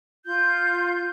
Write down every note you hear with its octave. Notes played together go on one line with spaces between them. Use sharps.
F4 G6